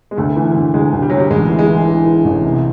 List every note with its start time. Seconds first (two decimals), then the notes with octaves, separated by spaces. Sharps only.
0.11 G#3
0.17 D2 A3
0.36 E3
0.55 D2
0.74 D2 G#3
0.93 D2
1.02 G3
1.10 D2 F#3
1.18 G3
1.30 A1 G#3
1.49 E3
1.59 G#3
1.68 E3
1.87 E3
2.06 E3
2.25 A1
2.44 C3